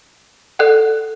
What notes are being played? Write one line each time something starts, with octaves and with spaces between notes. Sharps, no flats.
A4 D5 F#5 F#6